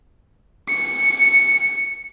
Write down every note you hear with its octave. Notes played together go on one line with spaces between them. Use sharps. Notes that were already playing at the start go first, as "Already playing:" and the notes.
C#7